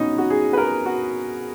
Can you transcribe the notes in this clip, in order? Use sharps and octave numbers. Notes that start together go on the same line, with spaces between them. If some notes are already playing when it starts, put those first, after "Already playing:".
Already playing: B2 F#3 B3 C#4 D#4
F#4
G#4
B4
A#4
F#4